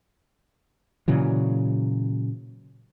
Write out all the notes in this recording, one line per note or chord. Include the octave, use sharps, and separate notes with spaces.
A#2 C#3 E3 F#3